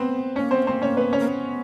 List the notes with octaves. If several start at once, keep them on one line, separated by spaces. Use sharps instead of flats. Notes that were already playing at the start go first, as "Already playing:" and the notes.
Already playing: B3 C4 B4 C5
A#3 C#4 C#5
B3 C4 C5
A#3
C4 C5
C#4 C#5
B3 B4
C#4 C#5
A#3
B3